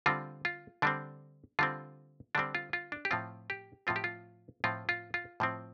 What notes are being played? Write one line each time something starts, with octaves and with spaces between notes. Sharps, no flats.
D3 G3 C4 F4
F4
D3 G3 C4 D4
D3 G3 C4 F4
D3 G3 C4 D4
F4
F4
D4
G4
A2 F3 C4 F4
G4
A2 F3 C4 F4
G4
F4
A2 F3 C4 F4
F4
F4
A2 F3 C4